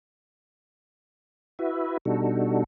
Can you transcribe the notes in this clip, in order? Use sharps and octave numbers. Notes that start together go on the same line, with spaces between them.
E4 F#4 B4 E5
B2 G3 D4 D#4 F#4 A4